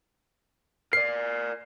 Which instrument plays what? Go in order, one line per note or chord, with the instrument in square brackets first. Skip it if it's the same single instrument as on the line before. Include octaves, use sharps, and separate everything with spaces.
[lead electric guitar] A#4 D5 [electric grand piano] C7